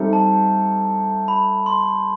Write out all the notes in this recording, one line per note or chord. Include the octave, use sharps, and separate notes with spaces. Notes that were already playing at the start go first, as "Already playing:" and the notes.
Already playing: G3 C4 D#4 A4 E5
A5
B5
C6